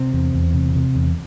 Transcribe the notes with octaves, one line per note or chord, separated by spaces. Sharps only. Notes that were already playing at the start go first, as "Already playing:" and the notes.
Already playing: C3 C4
E2
E2
C3
C3
E2